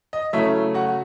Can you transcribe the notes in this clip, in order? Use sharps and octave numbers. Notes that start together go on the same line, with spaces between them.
D#5
C#3 F#3 A3 C#4 E4 E5
F#4 F#5